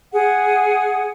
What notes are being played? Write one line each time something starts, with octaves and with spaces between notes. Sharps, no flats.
G#4 F#5